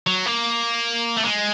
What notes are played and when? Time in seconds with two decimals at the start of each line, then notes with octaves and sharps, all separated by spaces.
0.07 F#3
0.26 A#3
1.17 A3
1.25 G#3